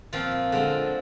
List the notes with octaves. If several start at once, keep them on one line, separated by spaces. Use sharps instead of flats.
A#2 F3 C4 F4
D3 G#3 C4 F4